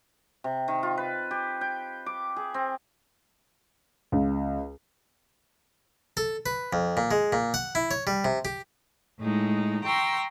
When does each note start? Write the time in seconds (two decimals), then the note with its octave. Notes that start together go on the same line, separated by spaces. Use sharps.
0.44 C3
0.68 D#3
0.83 F4
0.98 B4
1.31 G4
1.61 G5
2.06 D6
2.36 G#4
2.54 C4
4.12 C#2
6.17 A4
6.46 B4
6.73 F2
6.97 A#2
7.11 G#3
7.33 A#2
7.54 F#5
7.75 E4
7.91 C#5
8.07 G3
8.25 C3
8.45 G4
9.20 A2 G#3 D#4
9.84 G5 A#5 C6 C#6 E6